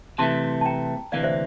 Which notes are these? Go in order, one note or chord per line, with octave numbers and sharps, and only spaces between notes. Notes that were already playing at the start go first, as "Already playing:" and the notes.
C3 E3 A3 A5 C6
A5
G5 A#5
D2 C3 E3 A#3 D5 F5
C5 E5